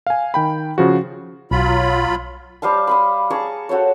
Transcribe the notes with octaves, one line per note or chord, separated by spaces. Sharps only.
F5 G#5
D#3 G5 B5
C#3 F3 F#4
B1 F#3 F4 B5
G3 C5 F5 A5
B5 C6 D#6
G#4 A5 A#5 C#6
F#4 A4 C5 C#5